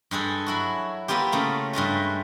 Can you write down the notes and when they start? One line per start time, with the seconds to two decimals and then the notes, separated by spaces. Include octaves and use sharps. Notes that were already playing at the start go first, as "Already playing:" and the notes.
0.11 G2 G#3 G#4 A4
0.46 F#3 E4 F#4
1.08 A#3 B3 E4 F4 G4
1.32 C#3 A3 A#3
1.73 G2 G#3 A3 F4